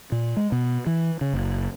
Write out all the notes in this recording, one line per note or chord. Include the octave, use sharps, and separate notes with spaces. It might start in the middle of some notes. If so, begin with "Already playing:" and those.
A#2
G#3
B2
E3
C#3
F#1